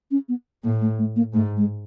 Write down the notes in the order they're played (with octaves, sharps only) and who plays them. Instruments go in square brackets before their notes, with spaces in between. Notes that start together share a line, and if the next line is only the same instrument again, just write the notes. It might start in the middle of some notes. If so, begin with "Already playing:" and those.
[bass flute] C#4
B3
[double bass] A2 [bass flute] A#3
[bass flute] A3
A3
A#3
[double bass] G#2 [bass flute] A3
[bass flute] G#3